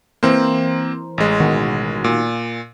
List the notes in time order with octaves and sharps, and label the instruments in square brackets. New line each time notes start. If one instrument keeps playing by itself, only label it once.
[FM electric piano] E3 A#4 C5 [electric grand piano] A#3 C4
[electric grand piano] A1 G#3
[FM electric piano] B2 D#3 F#4
[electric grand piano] A#2